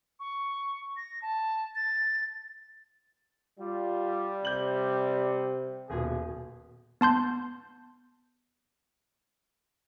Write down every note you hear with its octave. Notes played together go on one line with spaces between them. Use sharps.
C#6
A#6
A5
A6
G3 F4
C3 G6 F#7
D#1 B2 G#4
B3 A5 C6 G6